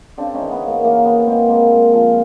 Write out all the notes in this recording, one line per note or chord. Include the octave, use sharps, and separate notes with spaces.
C#3 C4 D4
C#4 D#4
E3
B3
C#3
A#3
E3 A#3
E3 B3
G#3 A#3 C4
G#3 A#3 C4
A#2
F3